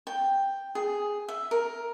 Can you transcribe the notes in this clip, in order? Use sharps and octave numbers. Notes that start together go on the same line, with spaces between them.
G5
G#4
E5
A#4